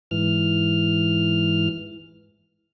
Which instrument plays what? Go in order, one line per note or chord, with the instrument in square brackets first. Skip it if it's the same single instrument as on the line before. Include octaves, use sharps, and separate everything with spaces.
[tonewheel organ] G#2 E3 F6